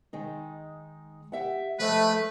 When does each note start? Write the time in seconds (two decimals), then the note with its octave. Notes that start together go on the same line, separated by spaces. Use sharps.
0.13 D#3 G#3 D#4
1.32 G4 E5 F#5
1.79 F3 G#3 A3 B4